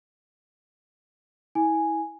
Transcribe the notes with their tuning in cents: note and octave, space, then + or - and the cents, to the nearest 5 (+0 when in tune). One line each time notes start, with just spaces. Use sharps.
E4 -30 G#5 +0